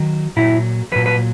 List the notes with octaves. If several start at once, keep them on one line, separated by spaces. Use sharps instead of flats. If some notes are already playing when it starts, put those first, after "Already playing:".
Already playing: D#3 F#3
A#2 F#3 E4
A#2 F#3 B4
B4